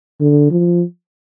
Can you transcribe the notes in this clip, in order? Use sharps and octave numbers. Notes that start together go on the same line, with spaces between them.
D3
F3